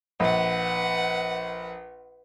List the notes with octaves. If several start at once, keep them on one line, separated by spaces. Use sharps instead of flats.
A#1 B4 F#5